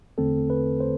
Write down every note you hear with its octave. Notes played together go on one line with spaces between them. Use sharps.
E2 D3 A3 C4 A4
B4
C5